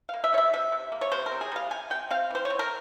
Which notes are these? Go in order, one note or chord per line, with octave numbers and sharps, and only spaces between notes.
A#3 F5
E5
G3 C#5
E5
C3 E5
C3
A#3
C#5
C3 C5
A#4
C4
G#4
G3 F5
C3 G#5
C3 G5
C4 F5
E3 C5
C#5
C4
A#4